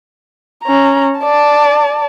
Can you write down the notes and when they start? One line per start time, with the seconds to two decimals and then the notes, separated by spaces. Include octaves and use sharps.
0.64 C#4 A#5
1.19 D5 A5